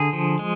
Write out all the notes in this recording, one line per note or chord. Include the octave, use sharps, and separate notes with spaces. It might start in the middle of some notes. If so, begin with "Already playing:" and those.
Already playing: D3 G#4
F3
G#3